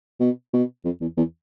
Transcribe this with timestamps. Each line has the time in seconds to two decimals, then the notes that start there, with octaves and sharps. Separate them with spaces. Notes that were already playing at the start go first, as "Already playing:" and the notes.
0.20 B2
0.53 B2
0.85 F2
1.01 E2
1.17 E2